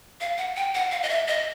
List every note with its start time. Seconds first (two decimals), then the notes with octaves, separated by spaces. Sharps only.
0.21 F5
0.38 F#5
0.57 G5
0.75 F#5
0.91 F5
1.03 D#5
1.09 E5
1.28 D#5